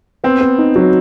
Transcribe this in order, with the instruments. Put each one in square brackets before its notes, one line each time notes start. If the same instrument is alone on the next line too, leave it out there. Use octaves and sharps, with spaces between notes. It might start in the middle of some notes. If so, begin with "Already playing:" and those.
[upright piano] B3 [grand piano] C4
[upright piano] B3
D#4
F#3